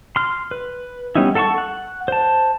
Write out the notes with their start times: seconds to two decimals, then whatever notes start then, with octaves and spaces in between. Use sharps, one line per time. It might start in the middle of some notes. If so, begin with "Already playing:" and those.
0.16 C6 F6
0.51 B4
1.15 G3 B3 C#4 D#4 E4
1.35 A4 F#5 A5 C6 C#6
1.58 F#5
2.08 C5 A5